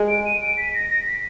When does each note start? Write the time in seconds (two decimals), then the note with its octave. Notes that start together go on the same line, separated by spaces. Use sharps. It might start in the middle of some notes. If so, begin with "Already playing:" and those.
Already playing: G#3
0.08 D7
0.25 D#7
0.42 D7
0.57 B6
0.74 A#6
0.90 A#6
1.06 B6